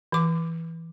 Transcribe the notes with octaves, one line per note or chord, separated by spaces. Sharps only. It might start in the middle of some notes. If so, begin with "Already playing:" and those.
E3 D6